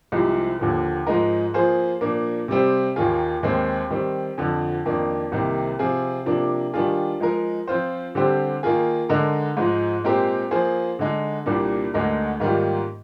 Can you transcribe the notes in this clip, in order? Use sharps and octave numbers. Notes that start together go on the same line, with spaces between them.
C2 C3 F3 G#3
D#2 D3 F3
G#2 F3 G#3 D#4 A#4
F3 A#3 F4 G#4 C5
A#2 F3 A#3 D4
C3 G3 C4
D#2 D#3 A#3 F4 G#4
D#2 D#3 G#3 C4
D#3 G3 C4
F2 D3 F3
F2 D#3 A#3 D4
C2 C3 D#3 A#3
C3 F3 C4 F4 G#4
C3 F3 A#3 D4
D#3 G3 D4 F4 G#4
F3 G#3 D#4 A#4
F3 C4 F4 C5
D3 G3 C4 G4 C5
D#3 A#3 F4 G#4
D3 G#3 D#4 A#4
G#2 F3 G#3 D#4
A#2 G#3 C4 G4 A#4
F3 A#3 F4 G#4 C5
D3 G#3 D#4
C2 A#2 G3 A#3 D4
D2 D3 G#3 D#4 A#4
G#2 D#3 G3 A#3 F4